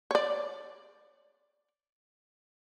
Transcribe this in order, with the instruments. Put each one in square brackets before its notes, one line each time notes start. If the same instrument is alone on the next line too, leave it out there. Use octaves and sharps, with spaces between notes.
[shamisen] C#5 D5